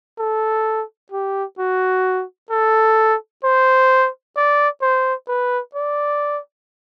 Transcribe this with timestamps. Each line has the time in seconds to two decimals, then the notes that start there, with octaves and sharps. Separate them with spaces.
0.19 A4
1.12 G4
1.59 F#4
2.51 A4
3.44 C5
4.37 D5
4.82 C5
5.28 B4
5.75 D5